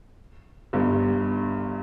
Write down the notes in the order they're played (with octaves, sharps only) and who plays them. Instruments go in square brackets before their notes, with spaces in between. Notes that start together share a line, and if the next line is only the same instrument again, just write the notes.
[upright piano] G1 G2